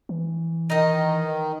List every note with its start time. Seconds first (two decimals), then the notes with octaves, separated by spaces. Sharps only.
0.09 E3
0.70 D#3 D#4 D#5